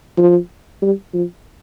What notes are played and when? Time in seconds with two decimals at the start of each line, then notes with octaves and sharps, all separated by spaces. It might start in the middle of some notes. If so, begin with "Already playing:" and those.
0.17 F3
0.82 G3
1.14 F3